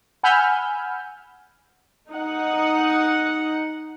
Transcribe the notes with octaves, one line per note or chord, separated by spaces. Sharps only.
F#5 G#5 B5 E6 F6 G6
D#4 F#5